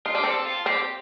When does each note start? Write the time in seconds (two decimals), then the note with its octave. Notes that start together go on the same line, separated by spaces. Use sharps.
0.06 D#4 F4
0.15 D4 G4
0.24 C4 A4
0.45 F4
0.66 C4 G4